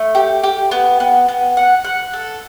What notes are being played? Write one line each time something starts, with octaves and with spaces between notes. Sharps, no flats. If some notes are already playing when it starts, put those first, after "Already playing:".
Already playing: A3
G4
G4
B3
B3
B3
F#5
F#5
A4